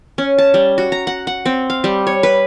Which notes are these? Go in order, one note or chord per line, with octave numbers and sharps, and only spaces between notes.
C#4
A5
G3
F#4
A#5
F#5
F#5
C4
F5
G3
C#5
B4